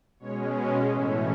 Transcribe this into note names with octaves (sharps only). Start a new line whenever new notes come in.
B2 G#3 C#4 C#5
D#5
A2 E3 A3 C#4 E5